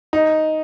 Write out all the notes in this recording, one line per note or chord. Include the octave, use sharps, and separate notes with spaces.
D#4